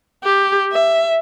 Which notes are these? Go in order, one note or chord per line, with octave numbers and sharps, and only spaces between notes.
G4
E5